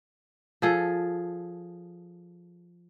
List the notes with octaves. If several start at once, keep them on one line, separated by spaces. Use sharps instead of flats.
F3 G#4 A4